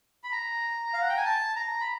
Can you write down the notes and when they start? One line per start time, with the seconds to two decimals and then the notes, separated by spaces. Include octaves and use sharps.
0.24 B5
0.32 A#5
0.94 F5
1.01 F#5
1.09 G5
1.17 G#5
1.25 A5
1.56 A#5
1.81 B5